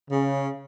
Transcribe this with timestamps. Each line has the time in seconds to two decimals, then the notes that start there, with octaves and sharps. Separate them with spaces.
0.11 C#3